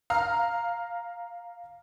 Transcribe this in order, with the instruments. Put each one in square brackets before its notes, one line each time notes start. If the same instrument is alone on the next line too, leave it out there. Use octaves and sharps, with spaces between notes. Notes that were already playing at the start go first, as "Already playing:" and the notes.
[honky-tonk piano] F5 A#5 F6